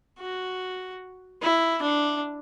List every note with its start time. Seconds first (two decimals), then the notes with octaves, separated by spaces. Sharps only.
0.19 F#4
1.42 E4
1.82 D4